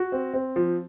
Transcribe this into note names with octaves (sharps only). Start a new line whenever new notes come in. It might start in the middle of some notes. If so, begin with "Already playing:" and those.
Already playing: F#4
C4
C4
F3